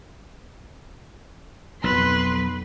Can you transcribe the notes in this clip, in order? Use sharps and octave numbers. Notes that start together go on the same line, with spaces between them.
B1 F2 F#3 B4 C6